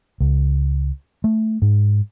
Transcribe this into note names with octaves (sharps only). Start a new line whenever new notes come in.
C#2
A3
G#2